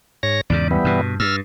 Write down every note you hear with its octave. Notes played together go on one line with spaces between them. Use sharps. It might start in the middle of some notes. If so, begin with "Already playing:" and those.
G#2 C#5 A#6
E2 G#2 C#3 D5
E3 G3 B3
G2 B2
G2 E6 F6